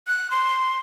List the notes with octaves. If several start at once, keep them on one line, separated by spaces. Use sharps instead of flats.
F#6
C6